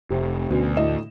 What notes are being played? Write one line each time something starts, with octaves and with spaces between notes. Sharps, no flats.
F1 C3
D2 B2 B3 C#4
A2 D#5 E7